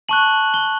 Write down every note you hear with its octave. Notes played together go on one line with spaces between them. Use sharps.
A5 C#6 F#6 F#7
G7